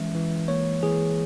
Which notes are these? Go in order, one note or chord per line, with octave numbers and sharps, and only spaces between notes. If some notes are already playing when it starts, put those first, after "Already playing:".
Already playing: E3 G#3 C#4 E5
E3
A#3 C#5
E3 G#4